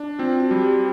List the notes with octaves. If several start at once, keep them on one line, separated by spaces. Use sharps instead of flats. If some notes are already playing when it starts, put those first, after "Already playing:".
Already playing: D4
C4 F4
F#4
G3
G4